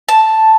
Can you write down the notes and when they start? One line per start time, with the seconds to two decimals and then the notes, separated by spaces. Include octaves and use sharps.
0.09 A5